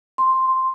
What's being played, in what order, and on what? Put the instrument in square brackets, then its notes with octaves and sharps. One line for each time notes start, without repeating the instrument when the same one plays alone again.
[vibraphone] C6